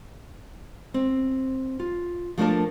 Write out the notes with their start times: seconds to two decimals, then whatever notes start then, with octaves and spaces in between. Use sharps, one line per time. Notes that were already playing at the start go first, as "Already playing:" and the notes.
0.94 C4
1.80 F4
2.38 F3 A3 A#3 D4 A#4 A5